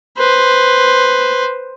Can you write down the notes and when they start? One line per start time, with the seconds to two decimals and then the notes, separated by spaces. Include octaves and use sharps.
0.18 B4 C5